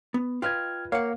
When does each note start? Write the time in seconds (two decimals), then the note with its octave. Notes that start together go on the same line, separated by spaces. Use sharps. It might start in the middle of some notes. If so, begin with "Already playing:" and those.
0.14 B3
0.42 F4 B4 D#5 G5 F6 G#6
0.92 A#3 C#5 F5 F#5